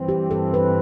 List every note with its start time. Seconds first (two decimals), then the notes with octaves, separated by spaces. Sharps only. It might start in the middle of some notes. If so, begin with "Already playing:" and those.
Already playing: G2 E3 G3 C4
0.09 G4
0.31 A4
0.54 B4